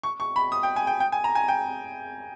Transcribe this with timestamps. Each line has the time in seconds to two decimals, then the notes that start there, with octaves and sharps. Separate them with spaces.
0.03 C#6
0.20 C#6
0.36 B5
0.52 D#6
0.63 G5
0.76 G#5
0.87 G5
1.00 G5
1.12 G#5
1.24 A#5
1.35 G#5
1.48 G5